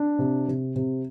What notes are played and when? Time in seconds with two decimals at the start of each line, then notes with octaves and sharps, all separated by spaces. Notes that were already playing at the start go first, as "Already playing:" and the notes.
Already playing: D4
0.19 C3
0.48 C3
0.76 C3